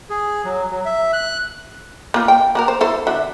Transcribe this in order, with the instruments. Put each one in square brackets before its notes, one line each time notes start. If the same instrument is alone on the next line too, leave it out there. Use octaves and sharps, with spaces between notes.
[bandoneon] G#4
F#3
F#3
E5
F#6
[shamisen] A#3 F4
G5
A#3 F#4 A#4
C5
E4 A4 C5
D3 F#4 E5